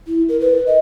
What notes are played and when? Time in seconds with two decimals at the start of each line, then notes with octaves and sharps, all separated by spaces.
0.07 E4
0.29 A#4
0.40 B4
0.66 D#5